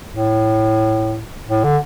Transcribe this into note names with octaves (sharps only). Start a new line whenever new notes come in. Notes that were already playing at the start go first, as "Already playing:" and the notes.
A2
A2
D3